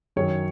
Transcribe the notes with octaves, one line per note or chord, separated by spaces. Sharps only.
F#2 D#3 F#3 C#5